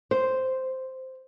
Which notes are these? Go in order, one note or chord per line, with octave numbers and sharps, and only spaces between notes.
C5